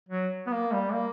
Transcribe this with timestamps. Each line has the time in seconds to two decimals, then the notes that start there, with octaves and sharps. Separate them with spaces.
0.09 F#3
0.46 B3
0.51 A#3
0.72 G3
0.93 A#3